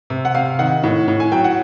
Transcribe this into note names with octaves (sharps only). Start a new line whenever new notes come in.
C3
F#5
C3 F5
D#3 F#5
A2
A2
G#5
F#3 G5
F#5